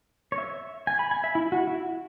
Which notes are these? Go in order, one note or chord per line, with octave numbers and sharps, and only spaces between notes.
C#5
E5
G#5
B5
G#5
E5
E4
F#4
E4